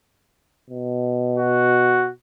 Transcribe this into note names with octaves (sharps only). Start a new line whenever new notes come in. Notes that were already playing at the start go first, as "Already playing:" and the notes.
B2
F#4